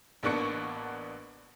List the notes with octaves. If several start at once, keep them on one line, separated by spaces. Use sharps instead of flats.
A1 A#3 B3 D4 C#6 C#7